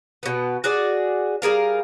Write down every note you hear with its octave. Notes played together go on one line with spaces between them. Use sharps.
B2 B3
F#4 G#4 D5
G3 G#4 A#4 F5